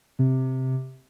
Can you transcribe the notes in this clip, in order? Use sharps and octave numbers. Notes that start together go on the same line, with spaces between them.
C3